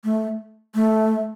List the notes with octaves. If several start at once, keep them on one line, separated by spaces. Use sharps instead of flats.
A3
A3